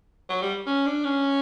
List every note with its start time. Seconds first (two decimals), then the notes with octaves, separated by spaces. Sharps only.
0.29 F#3
0.42 G3
0.66 C#4
0.86 D4
1.04 C#4